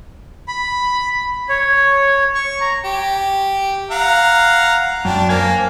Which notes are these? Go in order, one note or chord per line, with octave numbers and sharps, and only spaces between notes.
B5
C#5
C#6
A#5
G4
F5 F#5 A#5
F#2 D4 G5
A#3 C5 G#5